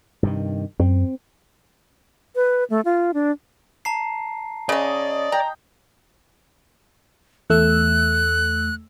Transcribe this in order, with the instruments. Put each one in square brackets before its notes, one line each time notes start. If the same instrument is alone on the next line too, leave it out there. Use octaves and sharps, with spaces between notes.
[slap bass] G2 C3 D#3
[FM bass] F#2 [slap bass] C4
[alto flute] B4
A3
F4
D4
[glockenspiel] A5 A#5 C7
[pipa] C#3 C#4 [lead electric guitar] D5 [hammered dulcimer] D#5
[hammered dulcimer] G5 [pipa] A#5
[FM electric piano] E2 A3 E6 [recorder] F#6